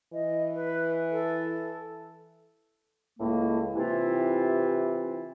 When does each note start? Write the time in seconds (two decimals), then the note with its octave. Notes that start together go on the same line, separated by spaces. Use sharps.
0.13 E3 D#5
0.54 B4
1.11 A4
3.19 C#2 A2 G#3 A#3
3.75 C3 E3 C4 E4 F4 G4